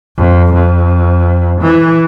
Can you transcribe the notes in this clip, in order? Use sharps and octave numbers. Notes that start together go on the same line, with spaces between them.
F2
F2
E3